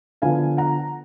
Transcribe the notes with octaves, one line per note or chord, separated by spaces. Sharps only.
D3 F3 B3 F5 G#5
F#5 A#5